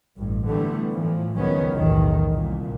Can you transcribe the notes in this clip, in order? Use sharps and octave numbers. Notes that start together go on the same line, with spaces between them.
A1 G2
D3 E3 G3 A3 B3
A2 E3 F3
C#2 D#3 F3 F#3 B3 C#4
B1 E2 A2 D#3
C2 A#2